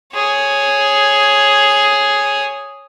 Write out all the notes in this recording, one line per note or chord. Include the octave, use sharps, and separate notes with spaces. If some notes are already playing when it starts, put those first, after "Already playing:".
G#4 C#5